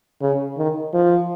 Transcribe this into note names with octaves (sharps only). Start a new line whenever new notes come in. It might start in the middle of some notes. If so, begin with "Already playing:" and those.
C#3
D#3
F3